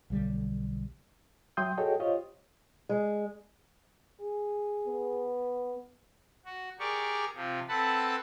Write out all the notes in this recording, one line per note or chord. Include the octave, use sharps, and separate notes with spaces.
B1 D3 G3
F#3 E5 G5 C6 D#6 G6
F#4 G#4 A4 C#5 D#5 G5
F4 G4 C5 C#5 D#5
G#3
G#4
B3
F#4
G4 G#4 A#4 D5 C#6
C3 F3
C4 A4 B4 F#5 A5 B5